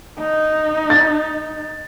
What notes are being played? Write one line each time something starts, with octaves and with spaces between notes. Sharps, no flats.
D#4
A6